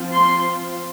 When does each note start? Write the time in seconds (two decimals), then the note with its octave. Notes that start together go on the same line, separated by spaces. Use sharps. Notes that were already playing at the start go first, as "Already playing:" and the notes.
Already playing: F3 C4
0.13 C6